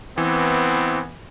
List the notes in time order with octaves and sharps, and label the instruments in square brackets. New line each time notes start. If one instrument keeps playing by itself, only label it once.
[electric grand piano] E3 [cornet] B3 [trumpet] C4